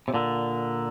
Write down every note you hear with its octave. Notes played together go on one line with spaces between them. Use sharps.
C3
A#2 D3